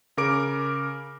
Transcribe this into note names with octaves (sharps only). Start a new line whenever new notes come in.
C#3 A#4 D6 D7